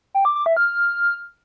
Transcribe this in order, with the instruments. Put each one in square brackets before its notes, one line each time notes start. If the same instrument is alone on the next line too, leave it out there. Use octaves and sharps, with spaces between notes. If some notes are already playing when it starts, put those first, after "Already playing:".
[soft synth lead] G5
D6
D6
E5
F6